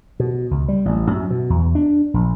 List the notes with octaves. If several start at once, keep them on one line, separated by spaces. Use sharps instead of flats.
B2
C#2
G3
A1
F#2
B2
E2
D4
A#1